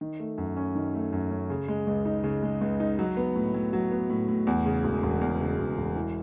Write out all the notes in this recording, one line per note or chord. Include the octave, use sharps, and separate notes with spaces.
D#3
A3
F#2
C#4
D#3
A3
F#2
C#4
C#3
G#3
C#2
D#4
C#3
G#3
C#2
D#4
F#3
B3
A2
A2
F#3
B3
A2
A2
E2
C#3
E1
E1
E2
C#3
E1
E1
E3